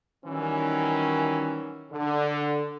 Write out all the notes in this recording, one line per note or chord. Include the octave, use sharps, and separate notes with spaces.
D#3 E3 F#3 G3 C#4
D3